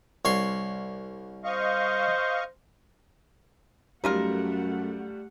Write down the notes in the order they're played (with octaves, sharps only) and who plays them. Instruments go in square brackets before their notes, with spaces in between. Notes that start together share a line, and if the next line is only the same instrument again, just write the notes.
[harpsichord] C2 C#5 C6
[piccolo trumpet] C5 [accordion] D#5 F5 C#6
[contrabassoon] F#2 [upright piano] G3 [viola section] A3 F#5 [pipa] D#4 F4 A#4